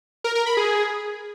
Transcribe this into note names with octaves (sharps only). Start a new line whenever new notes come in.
A#4
A#4
B5
G#4